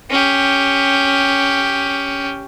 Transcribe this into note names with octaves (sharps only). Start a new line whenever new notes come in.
C#4 G4